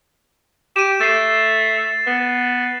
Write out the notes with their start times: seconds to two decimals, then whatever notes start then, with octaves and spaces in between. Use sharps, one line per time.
0.76 G4 D#7 E7
1.01 A3 A6 C7 D#7
2.07 B3